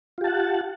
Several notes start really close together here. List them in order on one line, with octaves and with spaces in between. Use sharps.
F4 G4 A5 F#5